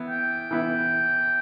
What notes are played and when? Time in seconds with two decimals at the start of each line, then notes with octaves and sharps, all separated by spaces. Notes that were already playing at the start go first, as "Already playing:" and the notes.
Already playing: E3 B3 E4
0.09 G5
0.51 E3 B3 E4